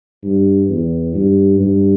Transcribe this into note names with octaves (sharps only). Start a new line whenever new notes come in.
G2
E2
G2
G2